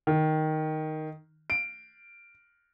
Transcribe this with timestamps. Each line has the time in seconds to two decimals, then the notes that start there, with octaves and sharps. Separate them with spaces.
0.07 D#3
1.50 D7